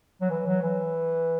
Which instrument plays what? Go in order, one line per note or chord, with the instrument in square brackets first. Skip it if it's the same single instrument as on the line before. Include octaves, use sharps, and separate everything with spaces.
[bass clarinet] F#3
E3
F#3
E3